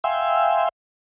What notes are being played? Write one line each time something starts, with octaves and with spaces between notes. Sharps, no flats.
E5 F5 G5 G#5 C6 E6